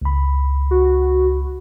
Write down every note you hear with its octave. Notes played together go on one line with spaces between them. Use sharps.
C#2 B5
F#4